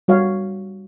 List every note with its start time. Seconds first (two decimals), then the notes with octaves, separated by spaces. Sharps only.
0.08 G3 F#4 C#5 F5